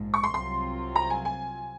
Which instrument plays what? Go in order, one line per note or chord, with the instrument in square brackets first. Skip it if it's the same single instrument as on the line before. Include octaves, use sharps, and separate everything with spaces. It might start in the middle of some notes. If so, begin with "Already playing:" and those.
Already playing: [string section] A#1 G#2 F3
[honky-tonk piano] C#6
C6
[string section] C2 C3 F#3 C4 F4 [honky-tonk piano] C6
[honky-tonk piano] A#5
G#5
G#5